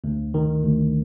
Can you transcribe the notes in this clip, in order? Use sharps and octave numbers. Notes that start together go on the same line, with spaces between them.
D2
D#3
D2